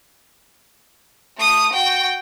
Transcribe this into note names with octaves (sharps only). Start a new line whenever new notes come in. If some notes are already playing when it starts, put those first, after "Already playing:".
A3 D#6
F#4 G5